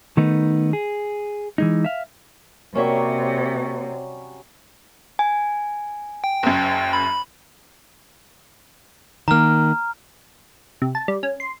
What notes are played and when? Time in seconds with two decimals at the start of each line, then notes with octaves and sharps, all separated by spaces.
0.17 D#3 A3 B3 D#4
0.73 G#4
1.58 E3 G#3 D#4
1.84 E5 F5
2.75 C3 F#3 G3 A#3 C#4 C#5 E5
5.19 G#5
6.24 G5
6.43 F#1 F#2
6.93 B5
9.28 D#3 A#3 A#5 F6
10.82 C3
10.95 A5
11.08 G3
11.23 C#4
11.40 C6